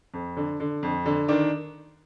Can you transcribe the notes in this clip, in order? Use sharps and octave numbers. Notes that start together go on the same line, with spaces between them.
F2
D3
D3
F2
D3
D#3 D4